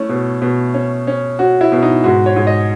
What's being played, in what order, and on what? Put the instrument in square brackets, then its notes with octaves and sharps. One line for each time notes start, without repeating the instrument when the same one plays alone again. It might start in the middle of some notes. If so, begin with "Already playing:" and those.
Already playing: [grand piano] A3 C#4 E4
B2
B2
C#4
C#4
C#4 F#4
E4
B2
D#4
G#2 F#4
C#5
G#2
D#5